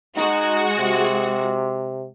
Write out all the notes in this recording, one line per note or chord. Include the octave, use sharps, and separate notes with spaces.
G#3 D#4 F#4
C3